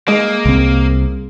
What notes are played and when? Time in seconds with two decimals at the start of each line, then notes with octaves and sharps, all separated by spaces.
0.08 G#3 A#3
0.46 C2 C4